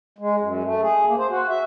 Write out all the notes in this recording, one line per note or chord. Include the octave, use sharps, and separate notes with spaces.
G#3
F#2
A3
G#4
A#3
C5
F#4
E5